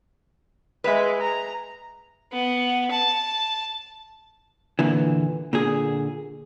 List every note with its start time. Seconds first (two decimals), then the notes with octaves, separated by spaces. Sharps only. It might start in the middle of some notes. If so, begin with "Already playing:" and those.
0.84 G#3 B4 E5
1.21 A#5
2.32 B3
2.91 A5
4.79 A#2 D3 E3
5.53 A#2 D3 G#4